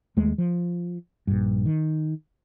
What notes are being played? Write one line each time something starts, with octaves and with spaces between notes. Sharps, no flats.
D#2 G#3 A3
F3
A#1 G2
D#3